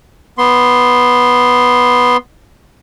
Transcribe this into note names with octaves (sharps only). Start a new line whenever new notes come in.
B3 C6